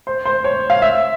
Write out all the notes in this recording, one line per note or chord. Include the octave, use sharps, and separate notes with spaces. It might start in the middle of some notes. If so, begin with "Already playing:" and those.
C5
C5
C#5
F5
E5